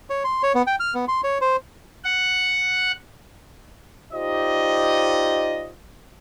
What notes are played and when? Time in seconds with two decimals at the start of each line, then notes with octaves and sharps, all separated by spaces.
0.10 C#5
0.24 C6
0.43 C#5
0.55 B3
0.67 G5
0.80 F6
0.94 B3
1.08 C6
1.24 C#5
1.41 C5
2.05 F#5
4.13 D#4 F4 G4 C5 D5 D#5